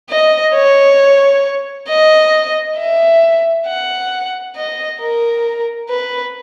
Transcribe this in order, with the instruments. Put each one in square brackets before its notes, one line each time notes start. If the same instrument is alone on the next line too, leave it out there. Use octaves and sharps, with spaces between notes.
[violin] D#5
C#5
D#5
E5
F#5
D#5
A#4
B4